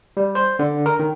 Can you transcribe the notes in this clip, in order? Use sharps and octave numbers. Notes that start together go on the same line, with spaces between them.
G3
C5
D3
A#4
D#3